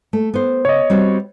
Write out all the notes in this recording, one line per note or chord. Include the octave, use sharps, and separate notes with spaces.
A3
B3 C5
C#3 C#5 D#5
G3 C4 F#4